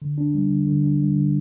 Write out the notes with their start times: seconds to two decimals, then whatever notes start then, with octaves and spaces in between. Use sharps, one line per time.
0.02 D3
0.18 D4
0.34 G3
0.50 D3
0.67 D3
0.84 D4
1.00 G3
1.16 D3